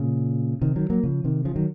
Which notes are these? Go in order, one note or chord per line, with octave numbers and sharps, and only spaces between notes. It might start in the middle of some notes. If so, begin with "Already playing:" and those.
Already playing: A#2 C#3
C3 D#3
D#3 F#3
F#3 A#3
C#3 F3
C3 D#3
C#3 F3
D#3 F#3